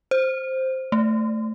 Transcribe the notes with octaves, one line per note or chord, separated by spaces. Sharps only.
C5
A3